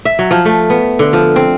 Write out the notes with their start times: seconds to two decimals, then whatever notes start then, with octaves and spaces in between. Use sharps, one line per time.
0.05 E5
0.19 F#3
0.31 F3
0.45 A3
0.70 B3
0.99 D3
1.13 F3
1.36 C4